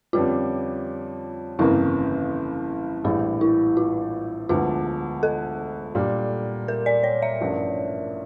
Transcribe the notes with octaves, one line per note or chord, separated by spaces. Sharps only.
F2 D3 G3 C#4 F4
G1 F2 C#3 E3 A#3 E4
A#1 A2 E3 G3 D4
E4
F4
E1 D2 D3 F3 F4
A4
A#2 G3 D4
A#4
D5
C#5
E5
A1 G2 F3